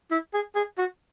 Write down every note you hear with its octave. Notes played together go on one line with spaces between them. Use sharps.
E4
G#4
G#4
F#4